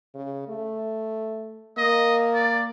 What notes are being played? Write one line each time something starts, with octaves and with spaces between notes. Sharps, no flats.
C#3
A3
A#3 D#5
D5